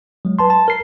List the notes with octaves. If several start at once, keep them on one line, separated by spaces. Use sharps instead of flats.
F#3 G#3
B4 A5 C6
A5
A#4 C7